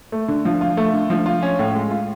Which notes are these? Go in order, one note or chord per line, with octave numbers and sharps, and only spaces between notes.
A3
D3
F3
F4
A3
D3
F3
F4
C#4
A2
G#3
F4